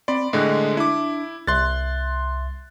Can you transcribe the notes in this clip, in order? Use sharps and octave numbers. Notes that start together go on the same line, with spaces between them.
C4 D5 B5 C6
A2 D3 G#3 D#5 F#6
D4 E4 D6
C2 E5 C6 F#6 A6